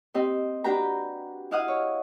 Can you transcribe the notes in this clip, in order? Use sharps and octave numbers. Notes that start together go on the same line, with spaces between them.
C4 G4 D#5
D4 F#4 G4 B4 G5 A#5
E4 D#5 F5 F#5 D#6
C#5